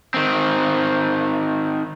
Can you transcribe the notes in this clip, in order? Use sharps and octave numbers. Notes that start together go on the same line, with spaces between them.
D#3 C4